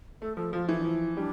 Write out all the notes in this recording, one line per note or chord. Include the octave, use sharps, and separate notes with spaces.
A3 A4
F3 A4
F3 F4
E3 E4
D4
F3 E4
G3 D4